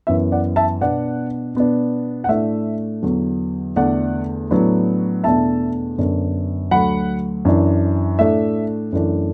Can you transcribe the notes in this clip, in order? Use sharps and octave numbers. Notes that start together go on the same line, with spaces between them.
F#2 E3 B3 E5
D5 F#5
E5 A5
B2 B3 D4 D5 F#5
B2 B3 D4
F#5
A2 A3 D4 E5
E2 D3 F#3
E2 D3 A3 D4 D5 F#5
A2 F#3 B3 D4
E2 B2 A3 D4 E5 A5
F#2 D3 B3 D4
D2 D3 F#3 F#5 B5
F#2 E3 D4
A2 A3 D4 E5
F#2 E3 A3 D4